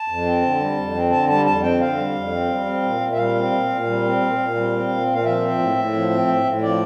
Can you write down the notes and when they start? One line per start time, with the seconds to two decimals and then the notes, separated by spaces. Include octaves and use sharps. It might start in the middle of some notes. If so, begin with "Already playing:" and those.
Already playing: A5
0.08 F2
0.25 C4
0.42 D3
0.60 G3
0.77 F2
0.94 C4
1.12 D3 A5
1.28 G3 A5
1.45 F2 A5
1.63 C4 G5
1.81 D3 F5
1.97 G3
2.15 F2
2.31 C4
2.50 G3
2.66 C4
2.83 A#2
3.01 A#2
3.13 E5
3.17 G3 F5
3.35 C4
3.52 A#2
3.69 A#2
3.86 G3
4.03 C4
4.21 A#2
4.38 A#2
4.55 G3
4.72 C4
4.89 A#2
5.07 A#2
5.14 F5
5.24 F3 E5
5.41 C4
5.58 A2
5.76 A2
5.93 F3
6.10 C4
6.28 A2
6.44 A2
6.62 F3 D5